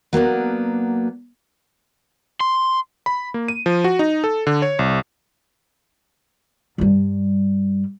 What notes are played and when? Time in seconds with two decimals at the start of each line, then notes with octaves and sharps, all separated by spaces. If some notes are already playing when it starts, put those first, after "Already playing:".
0.13 F#3 A#3 B3 D4
2.41 C6
3.06 B5
3.34 A#3
3.48 D#7
3.66 F3
3.84 F#4
3.99 D#4
4.24 A4
4.47 D3
4.62 C#5
4.79 C2
6.78 G2 G3